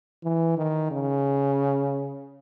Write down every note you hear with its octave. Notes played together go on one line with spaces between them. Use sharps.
E3
D#3
C#3